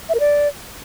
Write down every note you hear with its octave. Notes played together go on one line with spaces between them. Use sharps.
E5
A#4
D5